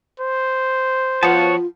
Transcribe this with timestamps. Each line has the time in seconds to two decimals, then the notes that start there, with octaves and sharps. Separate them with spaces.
0.20 C5
1.23 F3 B3 F4 F#4 C#5 A5